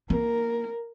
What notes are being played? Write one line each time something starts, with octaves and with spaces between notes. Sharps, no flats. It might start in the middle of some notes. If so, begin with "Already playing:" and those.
A#3 A#4